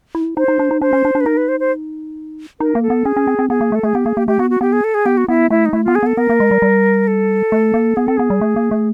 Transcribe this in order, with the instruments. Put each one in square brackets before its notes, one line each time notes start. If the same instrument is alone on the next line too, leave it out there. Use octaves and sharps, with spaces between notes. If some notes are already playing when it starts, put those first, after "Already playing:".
[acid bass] E4
[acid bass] D#4 [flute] C5
[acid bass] D#4
D4
D#4
[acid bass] D4 [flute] C5
[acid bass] C#4
D4
D4
[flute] B4
[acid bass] D#4 [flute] A#4
[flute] B4
C5
C5
[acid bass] D#4 [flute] A#4
[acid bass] A#3
[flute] A4
[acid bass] B3
[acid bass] C#4 [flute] G#4
[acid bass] C#4
C4
C4
[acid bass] B3 [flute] G#4
[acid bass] A#3
A3
[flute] A4
[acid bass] A3 [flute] G#4
[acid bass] B3 [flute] G4
[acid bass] A#3 [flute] G#4
[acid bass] A#3 [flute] G4
[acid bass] A3 [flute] G4
[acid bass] B3 [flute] F#4
[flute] F#4
[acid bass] B3 [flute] G4
[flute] G#4
A4
G#4
[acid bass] B3 [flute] G4
[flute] F#4
[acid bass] B3 [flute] E4
[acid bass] A3 [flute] E4
[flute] D#4
[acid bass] A3 [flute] E4
[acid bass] B3 [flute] F4
[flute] G#4
[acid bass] B3 [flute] A4
[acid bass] B3 [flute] A#4
[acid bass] A#3
G#3
G3
G3
[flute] A4
[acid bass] A3
A#3
[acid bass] B3 [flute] G#4
[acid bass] C4 [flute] A4
[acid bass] B3 [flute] G#4
[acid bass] G3
A3
A#3
A3